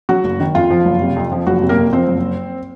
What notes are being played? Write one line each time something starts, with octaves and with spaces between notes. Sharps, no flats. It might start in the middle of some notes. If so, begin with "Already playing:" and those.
F#3 F#4
F#1
D#3
F2 F4
F3
F#1
C3
F2
F3
F#1 F#4
C3
A#3 A#4
F2
F3 C4 C5
F#1